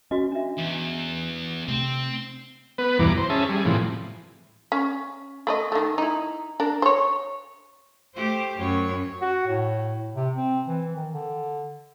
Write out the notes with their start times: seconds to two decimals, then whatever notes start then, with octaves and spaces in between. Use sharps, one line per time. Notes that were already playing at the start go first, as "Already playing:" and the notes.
0.11 C#4 F#4 D#5
0.32 D4 E5
0.58 E2
1.68 C3 A3 C4
2.78 B3 B4
2.99 E2 G2 B2 E3 A#5 D6
3.17 C5
3.30 C#4 G#4 E5 A5
3.49 G3 G#4
3.65 A2 C3 E3 F3
4.72 C#4
5.47 A3 B4 D#5
5.72 D#3 A3
5.98 D#4 E4
6.60 D4 A#4
6.82 C5 C#5
8.15 A3 G4 C5
8.58 F#2 C#5
9.21 F#4
9.47 A2
10.16 C3
10.36 C4
10.68 E3
10.96 D#3
11.13 D3